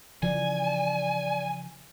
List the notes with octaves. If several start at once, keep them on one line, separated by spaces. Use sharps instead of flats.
C#3 E3 F3 D5 G#5